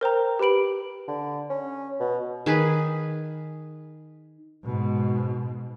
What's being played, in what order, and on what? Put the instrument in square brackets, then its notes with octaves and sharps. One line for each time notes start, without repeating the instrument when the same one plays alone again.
[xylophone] A#4 C5 G5 A#5
G4 B4 B5 D7 F#7
[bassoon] D3
C#4
B2
[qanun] D#3 G#4 B4
[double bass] G#2 B2